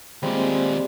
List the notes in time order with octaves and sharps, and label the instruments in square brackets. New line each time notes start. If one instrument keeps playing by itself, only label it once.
[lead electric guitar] D#2 F4 [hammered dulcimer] G3 [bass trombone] G#3 [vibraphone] A#3 C4 C5